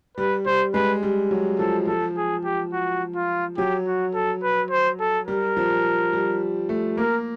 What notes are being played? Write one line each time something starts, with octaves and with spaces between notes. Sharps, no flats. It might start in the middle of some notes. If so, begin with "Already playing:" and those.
G3 B4
G3 C5
G#3 B4
G3
F#3
F3 A4
F3 A4
G#4
G4
F#4
F4
F#3 G4
F#4
A4
B4
C5
A4
G3 A#4
F3
G3
A3
A#3 A#4